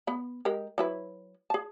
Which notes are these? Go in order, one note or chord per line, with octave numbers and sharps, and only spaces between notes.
B3 B5
G#3 G4 A#4
F#3 E4 B4
G#4 A5